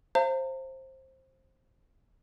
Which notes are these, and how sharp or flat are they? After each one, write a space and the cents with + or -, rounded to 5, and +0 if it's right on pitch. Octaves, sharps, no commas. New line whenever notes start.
C5 +15 F5 -35 A#5 -40